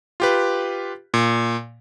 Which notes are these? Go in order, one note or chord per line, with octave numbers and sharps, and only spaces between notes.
F4 G4 B4
A#2